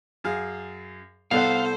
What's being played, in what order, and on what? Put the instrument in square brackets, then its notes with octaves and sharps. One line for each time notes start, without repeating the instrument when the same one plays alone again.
[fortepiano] F#2 G#4 F5
[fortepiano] C2 [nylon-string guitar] B3 D5 F#5 [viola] A4 C5 [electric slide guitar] F5